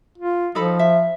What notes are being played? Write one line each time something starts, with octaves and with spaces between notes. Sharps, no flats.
F4
F3 D#4 A4 B5
E5